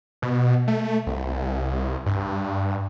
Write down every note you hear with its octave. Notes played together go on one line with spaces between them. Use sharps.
B2
A3
C2
G2